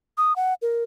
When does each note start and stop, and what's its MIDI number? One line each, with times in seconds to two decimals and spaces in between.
0.18 0.36 87
0.36 0.54 78
0.62 0.84 70